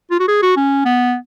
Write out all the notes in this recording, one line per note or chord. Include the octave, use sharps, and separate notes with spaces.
F4
F#4
G#4
F#4
C#4
B3